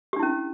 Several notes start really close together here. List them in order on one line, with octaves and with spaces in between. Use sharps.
G4 D4 E4 C#4